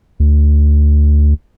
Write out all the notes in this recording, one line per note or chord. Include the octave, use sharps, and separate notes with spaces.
D2